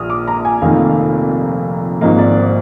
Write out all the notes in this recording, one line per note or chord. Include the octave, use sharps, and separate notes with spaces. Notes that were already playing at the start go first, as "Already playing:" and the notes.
Already playing: A#1 A#2 D#6 F6
D6
A#5
G#5
F1 F2 D#3 A#3 D#4 F5
G#1 G#2 F3 A#3 D#5
D5
C5